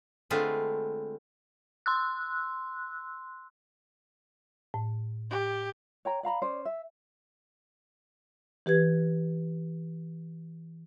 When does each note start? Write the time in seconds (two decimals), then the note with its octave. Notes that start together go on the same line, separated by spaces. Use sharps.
0.30 D3 G#3 A3 C4 F4 B4
1.86 C6 E6 F#6
4.74 A2
5.31 G4
6.05 C#5 G5 A#5
6.23 D5 F5 A#5 B5
6.42 C#4 C5 D5
6.65 E5
8.66 E3 G4 B4 G#6